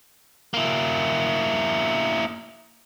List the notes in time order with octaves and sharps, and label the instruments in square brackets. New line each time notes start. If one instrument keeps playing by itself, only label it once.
[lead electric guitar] A#3 E4